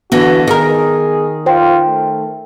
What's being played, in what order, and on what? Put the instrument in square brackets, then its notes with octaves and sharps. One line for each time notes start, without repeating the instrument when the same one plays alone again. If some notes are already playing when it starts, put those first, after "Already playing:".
[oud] D3 E3 [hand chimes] B3 A#6 [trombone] F#4
[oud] D#3 A#4 [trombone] G#4
[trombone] F4 [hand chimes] C5 G5
[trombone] A3